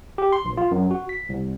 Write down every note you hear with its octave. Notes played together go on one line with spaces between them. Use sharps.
G4
C6
A#1
F4
F#2
F#4
B6
C2